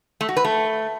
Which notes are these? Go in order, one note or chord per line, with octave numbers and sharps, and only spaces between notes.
A3
F#4
B4
A3